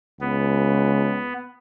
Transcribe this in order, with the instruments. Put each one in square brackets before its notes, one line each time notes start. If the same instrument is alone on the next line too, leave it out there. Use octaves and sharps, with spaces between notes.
[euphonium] C#2 [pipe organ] B3